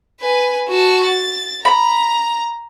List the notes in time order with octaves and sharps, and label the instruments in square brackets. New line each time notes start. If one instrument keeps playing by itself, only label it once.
[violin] B4 G#5
F#4 A5
A6
[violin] A#5 [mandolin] B5